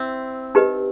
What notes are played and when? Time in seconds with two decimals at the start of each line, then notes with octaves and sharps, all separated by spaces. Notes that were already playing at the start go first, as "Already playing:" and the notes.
Already playing: C4 E4
0.55 D#4 G4 B4 D#5